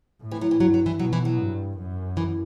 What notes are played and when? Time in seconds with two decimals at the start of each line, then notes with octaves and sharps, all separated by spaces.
0.21 A2
0.31 E3
0.41 F#3
0.51 E3
0.60 G2 F#3
0.74 F#3
0.86 E3
1.00 B2 F#3
1.13 E3
1.25 F#3
1.39 G2
1.78 F#2
2.17 E3